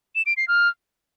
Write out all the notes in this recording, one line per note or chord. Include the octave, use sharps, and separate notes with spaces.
E7
D7
C7
F6